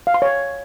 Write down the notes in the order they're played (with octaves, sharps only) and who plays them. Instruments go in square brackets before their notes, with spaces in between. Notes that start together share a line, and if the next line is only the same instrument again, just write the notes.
[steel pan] F5
C6
C#5